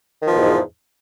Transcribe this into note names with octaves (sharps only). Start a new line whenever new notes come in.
E2 G#2 B2 D#3 F3